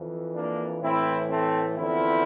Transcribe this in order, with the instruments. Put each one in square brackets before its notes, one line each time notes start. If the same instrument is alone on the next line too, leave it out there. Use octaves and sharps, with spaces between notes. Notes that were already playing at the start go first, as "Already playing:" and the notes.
Already playing: [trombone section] F2 E3
A#3 D4
A2 E3 C4 E4
A3 C4
E2 D3 F3 C4 E4